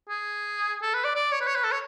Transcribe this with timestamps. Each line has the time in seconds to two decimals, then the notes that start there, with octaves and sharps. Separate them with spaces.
0.09 G#4
0.82 A4
0.94 B4
1.04 D5
1.15 D5
1.32 C#5
1.41 B4
1.47 C#5
1.55 B4
1.64 A4
1.72 C#5